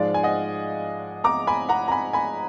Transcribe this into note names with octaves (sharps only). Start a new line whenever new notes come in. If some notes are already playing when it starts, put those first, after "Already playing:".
Already playing: G#2 F3 G#3 D5 F5
G#5
D#5 F#5
A#5 D6
G#5 B5
F#5 A#5
A#5
G#5 B5
G#5 B5